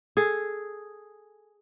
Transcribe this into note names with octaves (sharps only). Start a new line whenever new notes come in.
G#4 A4